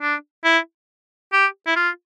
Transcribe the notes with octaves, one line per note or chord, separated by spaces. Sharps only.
D4
E4
G4
E4
F4